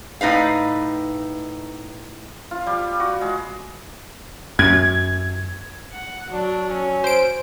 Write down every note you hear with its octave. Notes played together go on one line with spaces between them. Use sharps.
A2 D#4 B4 F5
F4
G3
F#4
G#3
F#2 G#6
F#5
F#3 D4
C#4
C5 D7